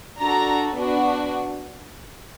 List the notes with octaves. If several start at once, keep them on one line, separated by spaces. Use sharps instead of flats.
D4 F#4 A4 A#5
B3 D4 F#4